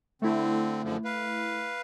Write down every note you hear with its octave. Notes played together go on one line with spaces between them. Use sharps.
D3 A3 C4 E4
F#2 D3 F3
B4 F5